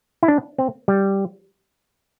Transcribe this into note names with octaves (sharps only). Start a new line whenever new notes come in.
E4
D4
C4
G3